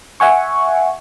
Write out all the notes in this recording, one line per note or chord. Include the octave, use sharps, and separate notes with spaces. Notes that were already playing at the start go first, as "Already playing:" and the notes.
E5 F#5 G#5 C#6